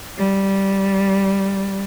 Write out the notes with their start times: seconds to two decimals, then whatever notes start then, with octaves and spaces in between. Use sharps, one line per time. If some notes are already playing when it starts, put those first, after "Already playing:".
0.18 G3